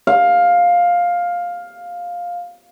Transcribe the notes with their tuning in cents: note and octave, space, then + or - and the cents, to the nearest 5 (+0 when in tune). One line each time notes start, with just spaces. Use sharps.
F5 +10